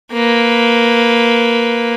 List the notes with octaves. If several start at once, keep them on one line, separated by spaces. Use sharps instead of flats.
A#3 B4